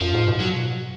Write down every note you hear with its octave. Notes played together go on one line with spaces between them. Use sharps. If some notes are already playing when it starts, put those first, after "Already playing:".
F#2 F3
G#2
B2
F#3